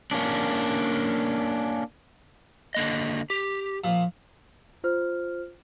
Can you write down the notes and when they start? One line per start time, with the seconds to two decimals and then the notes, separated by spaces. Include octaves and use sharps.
0.11 A#3 C#4 D4
2.75 D3 A#3 D#5
3.30 G4
3.84 A#2 F3
4.84 F4 C5 F6